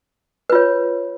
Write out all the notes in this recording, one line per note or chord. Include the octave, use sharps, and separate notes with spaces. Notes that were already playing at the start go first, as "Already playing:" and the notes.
F4 B4 C#5